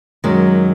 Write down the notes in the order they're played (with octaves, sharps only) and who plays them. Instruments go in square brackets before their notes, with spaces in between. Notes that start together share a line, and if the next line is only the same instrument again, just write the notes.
[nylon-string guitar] F#2 D#3 G#3 [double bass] F#3